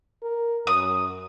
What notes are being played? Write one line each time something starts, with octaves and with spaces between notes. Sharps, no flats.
A#4
F#2 D#6